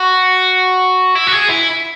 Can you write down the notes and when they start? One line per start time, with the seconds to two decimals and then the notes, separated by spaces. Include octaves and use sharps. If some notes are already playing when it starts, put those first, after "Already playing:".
Already playing: F#4
1.15 E4
1.27 F#4
1.32 G#4
1.49 E4